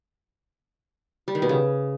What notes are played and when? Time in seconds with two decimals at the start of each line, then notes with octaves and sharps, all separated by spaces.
1.28 G3
1.35 D#3
1.42 B2
1.49 C#3